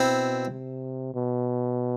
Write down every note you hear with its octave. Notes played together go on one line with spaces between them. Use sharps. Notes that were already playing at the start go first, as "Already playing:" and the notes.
Already playing: B2 C4 E4
C3
B2